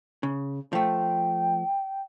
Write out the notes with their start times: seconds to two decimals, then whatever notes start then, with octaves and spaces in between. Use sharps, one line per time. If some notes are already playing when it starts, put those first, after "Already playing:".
0.23 C#3
0.73 F3 A3 G5